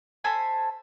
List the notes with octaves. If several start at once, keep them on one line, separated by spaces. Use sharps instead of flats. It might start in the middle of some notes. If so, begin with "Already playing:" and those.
A4 C5 G#5 B5